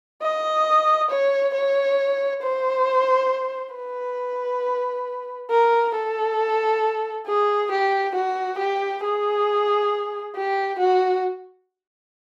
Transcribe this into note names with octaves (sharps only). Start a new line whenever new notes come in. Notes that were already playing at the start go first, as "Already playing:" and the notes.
D#5
C#5
C#5
C5
B4
A#4
A4
G#4
G4
F#4
G4
G#4
G4
F#4